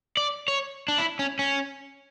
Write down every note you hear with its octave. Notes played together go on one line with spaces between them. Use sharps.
D5
C#5
D4
E4
C#4
C#4